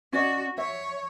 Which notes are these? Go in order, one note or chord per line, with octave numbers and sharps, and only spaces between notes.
C#4 F#4 D5 D#5
C#5 E5